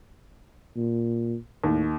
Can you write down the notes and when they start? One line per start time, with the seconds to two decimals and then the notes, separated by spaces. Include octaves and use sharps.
0.76 A#2
1.64 D#2 A2